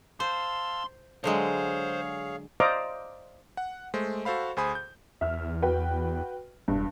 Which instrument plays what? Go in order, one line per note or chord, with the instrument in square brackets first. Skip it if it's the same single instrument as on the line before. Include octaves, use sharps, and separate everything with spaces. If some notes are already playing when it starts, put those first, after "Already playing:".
[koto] C5 [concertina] F5 A5 E6 [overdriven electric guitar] C6
[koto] D3 F#3 G#3 [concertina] G#4 C#5 F5 [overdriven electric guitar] C5
[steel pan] C5 D5 D#5 F5 A#5 D6
[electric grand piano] F#5
G#3 A3 C5
F#4 A4 C5 F5 B5
D2 G#4 C5 G#5 B5 D#6
G6
[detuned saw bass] E2 [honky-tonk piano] E5 F6
[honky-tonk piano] F#4 B4 G5
[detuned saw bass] E1 [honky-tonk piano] G2